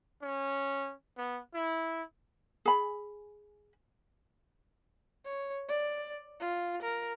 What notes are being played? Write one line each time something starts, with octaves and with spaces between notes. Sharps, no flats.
C#4
B3
E4
G#4 B5
C#5
D5
F4
A#4